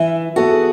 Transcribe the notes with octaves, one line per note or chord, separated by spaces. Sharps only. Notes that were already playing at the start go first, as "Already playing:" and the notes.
Already playing: E3 E5
B3 F#4 A4
G#4